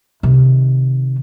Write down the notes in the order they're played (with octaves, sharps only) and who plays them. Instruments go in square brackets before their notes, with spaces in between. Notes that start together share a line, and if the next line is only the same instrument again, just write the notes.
[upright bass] C3 D#3